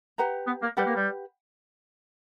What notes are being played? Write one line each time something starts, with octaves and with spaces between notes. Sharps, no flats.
G4 B4 F#5 A#5
B3
A#3
G3 G4 B4 F#5 B5
A#3
G3